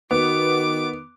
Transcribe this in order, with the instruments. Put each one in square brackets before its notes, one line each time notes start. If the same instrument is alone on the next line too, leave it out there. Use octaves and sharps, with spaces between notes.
[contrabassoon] D#3 [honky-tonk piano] B3 [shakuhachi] F#4 [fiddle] D6